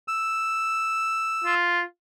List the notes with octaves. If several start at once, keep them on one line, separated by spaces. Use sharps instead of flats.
E6
F4